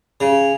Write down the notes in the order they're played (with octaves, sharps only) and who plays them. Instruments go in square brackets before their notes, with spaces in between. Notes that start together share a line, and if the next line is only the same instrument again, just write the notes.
[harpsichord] C#3